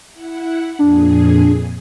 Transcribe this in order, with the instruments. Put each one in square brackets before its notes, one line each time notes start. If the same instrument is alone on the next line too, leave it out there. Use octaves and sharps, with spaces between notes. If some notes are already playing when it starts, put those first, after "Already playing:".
[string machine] E4 F#5
[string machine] F2 A#2 G#4 [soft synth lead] D4